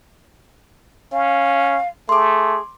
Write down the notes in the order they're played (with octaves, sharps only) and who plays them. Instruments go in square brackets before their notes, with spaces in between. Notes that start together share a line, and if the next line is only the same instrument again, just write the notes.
[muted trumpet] C#4 [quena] F5
[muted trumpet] A3 [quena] G#4 [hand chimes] C6 D6